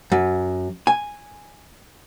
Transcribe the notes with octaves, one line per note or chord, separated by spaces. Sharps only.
F#2
G#5